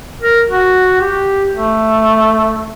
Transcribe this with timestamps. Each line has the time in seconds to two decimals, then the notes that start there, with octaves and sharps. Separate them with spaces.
0.22 A#4
0.50 F#4
1.01 G4
1.54 A3